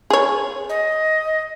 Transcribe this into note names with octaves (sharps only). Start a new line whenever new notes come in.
G#4 C#5
D#5